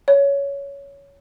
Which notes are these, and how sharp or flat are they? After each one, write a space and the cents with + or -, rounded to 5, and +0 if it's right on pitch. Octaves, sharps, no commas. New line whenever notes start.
C#5 +15